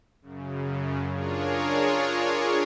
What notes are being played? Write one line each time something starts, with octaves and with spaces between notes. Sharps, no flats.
F#2 C#3
D4 F4 G#4 A#4 C#5